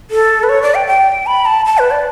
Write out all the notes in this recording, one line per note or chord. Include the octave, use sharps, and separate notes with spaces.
A4
B4
C#5
D5
G5
G5
B5
A5
A5
B4
D5